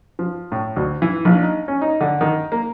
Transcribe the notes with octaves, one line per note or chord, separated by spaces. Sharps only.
F3
A2
D2
E3
A#1
D#4
C#4
D#4
D3
D#3
A#3